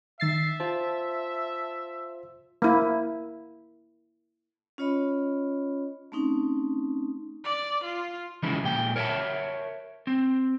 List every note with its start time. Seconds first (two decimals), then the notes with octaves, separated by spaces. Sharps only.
0.20 D#3 E5 A6 C7
0.60 F4 C5 A5
2.62 A#3 E4
4.78 C#4 F4 C#5 D#5 B5
6.12 A3 C4 C#4 D#4
7.44 D5
7.83 F4
8.43 C#3 E3 F3 G#3 D#4 E4
8.64 A#2 G#3 G5
8.96 A#4 C#5 D#5 E5 A5
10.07 C4